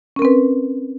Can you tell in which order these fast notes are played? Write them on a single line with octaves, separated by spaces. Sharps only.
C#4 A#4 C4 B4